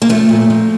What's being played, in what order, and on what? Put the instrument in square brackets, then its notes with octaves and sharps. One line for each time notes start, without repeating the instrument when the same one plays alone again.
[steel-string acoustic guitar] A#3
F3 A3
A#2
F3